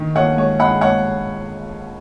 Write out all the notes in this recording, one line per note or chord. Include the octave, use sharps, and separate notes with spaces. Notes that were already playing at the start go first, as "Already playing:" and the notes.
Already playing: D#3
D#2 C#5 F#5
G#3 C#5
G#3 F#5 B5
G#3 C#5 F#5